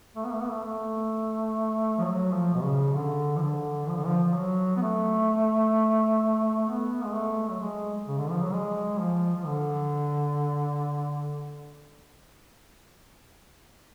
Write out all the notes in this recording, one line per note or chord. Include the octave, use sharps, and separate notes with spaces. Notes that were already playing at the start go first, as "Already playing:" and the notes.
A3
B3
A3
B3
A3
A3
F3
F#3
F3
B2
C#3
D3
F3
D3
F3
D3
F3
F3
F#3
B3
A3
B3
G#3
A3
F#3
G#3
C#3
D3
F3
F#3
G#3
F3
F3
D3